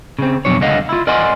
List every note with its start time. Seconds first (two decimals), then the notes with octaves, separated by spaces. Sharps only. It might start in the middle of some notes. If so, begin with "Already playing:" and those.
0.19 C#3 C4
0.45 F2 B2 F#3 D4 C#5
0.61 C#2 D3 D#5 F5 F#5
0.89 E4 F4
1.07 A#4 D5 D#5 F#5 G#5 C6